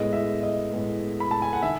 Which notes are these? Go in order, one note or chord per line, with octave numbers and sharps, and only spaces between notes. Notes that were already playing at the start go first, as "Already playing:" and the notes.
Already playing: A2 G#3 B3 D#5
E5
D#5
A2 G#3 B3
B5
A5
G#5
F#5
D#3 E5